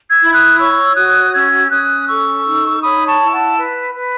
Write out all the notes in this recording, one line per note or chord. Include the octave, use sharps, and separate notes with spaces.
E6 G#6
E4
D#6 F#6
C#5 C#6 E6
F#4 D#6 F#6
C#4 E6 G#6
C#4 D#6 F#6
A4 C#6 E6
D#4
C#5 B5 D#6
A5 C#6
E4
F#5 A5
B4
B4